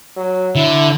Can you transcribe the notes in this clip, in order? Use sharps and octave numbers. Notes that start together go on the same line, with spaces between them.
F#3
D3 E4